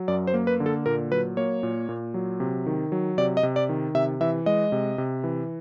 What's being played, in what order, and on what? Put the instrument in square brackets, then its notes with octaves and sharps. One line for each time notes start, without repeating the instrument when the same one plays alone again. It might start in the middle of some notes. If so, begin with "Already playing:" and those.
Already playing: [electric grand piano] F#3
F#2 D5
C5
A#3
B4
D3
A4
A#2 A#4
F#3 B4
A#3 C#5
A#2
A#2
F#3
C3
D#3
F#3
C3 D5
D#5
C3
D5
D#3
C3 E5
E3 E5
G#3 D#5
C3
C3
E3